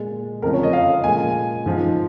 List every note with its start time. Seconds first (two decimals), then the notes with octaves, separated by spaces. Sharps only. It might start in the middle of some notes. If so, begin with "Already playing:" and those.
Already playing: A#2 G#3
0.42 F2 C#3 F3 G#3 A#4
0.53 C#5
0.63 D#5
0.73 F5
1.04 A#2 F3 G#3 G#5
1.66 G#2 F3 G#3